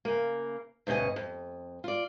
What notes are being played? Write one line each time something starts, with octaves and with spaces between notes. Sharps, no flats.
C#3 A#3
D2 G2 B2 C#4 D#5
F2
F4 D5